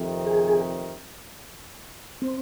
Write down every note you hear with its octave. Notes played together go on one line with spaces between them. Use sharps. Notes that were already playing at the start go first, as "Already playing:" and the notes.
Already playing: F2 C3 D#3
G#4
C4